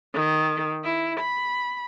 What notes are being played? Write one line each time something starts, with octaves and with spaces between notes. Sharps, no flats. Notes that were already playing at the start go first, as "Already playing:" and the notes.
D#3
E4
B5